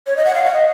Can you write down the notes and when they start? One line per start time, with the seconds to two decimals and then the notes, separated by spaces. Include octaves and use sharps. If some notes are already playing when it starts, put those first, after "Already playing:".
0.07 C#5
0.17 D#5
0.25 F#5
0.35 F5
0.44 F#5
0.54 D#5